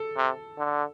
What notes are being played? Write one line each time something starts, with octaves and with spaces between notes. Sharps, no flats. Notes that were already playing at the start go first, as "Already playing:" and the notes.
Already playing: A4
C3
D3